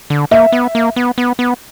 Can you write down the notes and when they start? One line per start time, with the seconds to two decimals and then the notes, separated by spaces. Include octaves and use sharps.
0.10 D3
0.31 A#3 E5
0.52 B3
0.75 A#3
0.96 B3
1.18 B3
1.39 B3